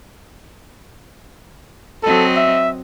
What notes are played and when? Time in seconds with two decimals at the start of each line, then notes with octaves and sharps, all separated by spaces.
2.03 F#3 C4 A4 D#5
2.37 E5